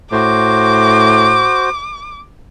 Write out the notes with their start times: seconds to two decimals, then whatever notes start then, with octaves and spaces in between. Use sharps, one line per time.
0.12 A2 F#4 C5 D6